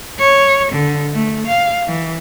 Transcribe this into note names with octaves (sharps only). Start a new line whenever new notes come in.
C#5
D3
A3
F5
E3